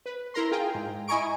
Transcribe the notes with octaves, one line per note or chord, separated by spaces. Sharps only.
B4
E4 A#4 A#5 C6
F4 G#4 G5
G#2
E4 D#5 G#5 A#5 C#6 D7